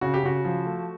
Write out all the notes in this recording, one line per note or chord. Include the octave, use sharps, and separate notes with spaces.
C#3 F#4
G4
C#3 F#4
F3
A3